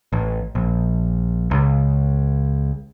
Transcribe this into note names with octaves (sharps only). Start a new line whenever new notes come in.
A1
A#1
C#2